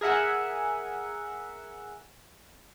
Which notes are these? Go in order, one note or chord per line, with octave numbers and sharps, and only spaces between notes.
G#4 A#4 E5 F#5 G#5